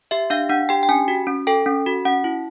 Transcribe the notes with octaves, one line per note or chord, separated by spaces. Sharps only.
G4 E5
D4 F5
D4 F#5
G4 G5
G5
C#4 G#5
F#4
C#4
A4 G5
C#4
F#4
C#4 F#5
E4